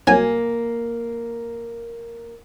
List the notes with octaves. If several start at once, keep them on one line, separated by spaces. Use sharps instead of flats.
C2 F#3 A#3 G#5